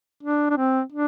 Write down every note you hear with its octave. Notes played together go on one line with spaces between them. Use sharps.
D4
D4
C4
D4